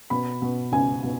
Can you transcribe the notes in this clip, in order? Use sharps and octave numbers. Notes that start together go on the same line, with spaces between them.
B2 B5
B2
C#2 G#5
B2